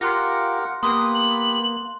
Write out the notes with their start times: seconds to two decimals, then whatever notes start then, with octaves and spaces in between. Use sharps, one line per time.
0.01 F4 G4 A#4 F#5 C6 F#6 A#6
0.83 A#3 B3 G4 B5 C6 D#6 F#6
1.15 F#7